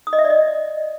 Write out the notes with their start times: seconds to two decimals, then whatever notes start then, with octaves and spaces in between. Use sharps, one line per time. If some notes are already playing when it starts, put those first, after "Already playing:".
0.07 D#6
0.13 D#5
0.19 E5
0.24 D5
0.30 D#5